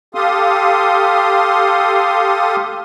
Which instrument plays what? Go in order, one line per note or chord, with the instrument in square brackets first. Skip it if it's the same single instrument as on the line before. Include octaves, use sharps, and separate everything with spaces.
[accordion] G4 A4 F5 C6 D#6